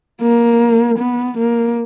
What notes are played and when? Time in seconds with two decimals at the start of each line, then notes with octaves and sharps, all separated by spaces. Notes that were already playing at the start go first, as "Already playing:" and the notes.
0.21 A#3
0.98 B3
1.37 A#3